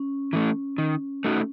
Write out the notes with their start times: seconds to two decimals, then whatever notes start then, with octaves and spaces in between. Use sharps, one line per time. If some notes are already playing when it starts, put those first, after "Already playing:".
Already playing: C#4
0.33 E3 A3
0.78 D#3
1.24 A3 D#4 F#4